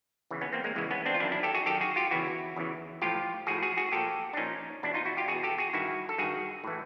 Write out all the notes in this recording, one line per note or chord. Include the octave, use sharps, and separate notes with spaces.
E2 C#3 E3
B3 C#4
A#3 C4
G#3 A#3
E2 C#3 E3 G#3
B3 C#4
C4 D4
F4
F#2 D#3 D4 E4
D4 E4
G4 A4
F#4 G#4
F#2 D#3 G4 A4
F#4 G#4
F4 G4
E2 C#3 E3 E4 F#4
E2 C#3 E3
A2 F3 F4 G4
A2 F3 F#4 G#4
F#4 G#4
F#4 G#4
A#2 F3 G4 A4
D4
A#2 F3 C#4 D#4
E2 B2 D4 E4
D#4 F4
E4 F#4
F4 G4
E2 B2 F#4 G#4
G4 A4
F#4 G#4
G2 D#3 E4 F#4
A4
G2 D#3 F#4 G#4
A2 E3